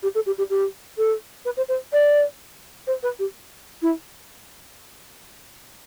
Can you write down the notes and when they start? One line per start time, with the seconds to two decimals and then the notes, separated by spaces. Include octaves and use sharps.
0.03 G4
0.15 A4
0.26 G4
0.38 G4
0.50 G4
0.97 A4
1.45 B4
1.57 C5
1.68 C5
1.93 D5
2.87 C5
3.03 B4
3.19 G4
3.82 E4